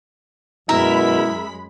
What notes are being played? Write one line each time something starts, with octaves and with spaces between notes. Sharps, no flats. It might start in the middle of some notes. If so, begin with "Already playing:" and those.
F#2 B2 G#3 E4 A#4 E5 B5